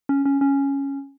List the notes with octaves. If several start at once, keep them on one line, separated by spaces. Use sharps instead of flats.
C#4
C#4
C#4